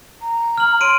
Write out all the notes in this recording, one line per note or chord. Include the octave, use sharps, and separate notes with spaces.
A#5
F6 F#7
C#5 C6 D7 D#7